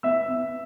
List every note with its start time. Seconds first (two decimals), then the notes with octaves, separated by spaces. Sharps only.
0.03 B3 E5 E6
0.29 B3